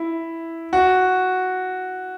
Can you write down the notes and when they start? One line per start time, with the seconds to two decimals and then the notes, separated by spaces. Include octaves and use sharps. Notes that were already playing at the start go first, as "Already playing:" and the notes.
Already playing: E4
0.73 F#4